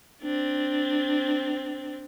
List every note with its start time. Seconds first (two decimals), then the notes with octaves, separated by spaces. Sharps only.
0.22 C4 D4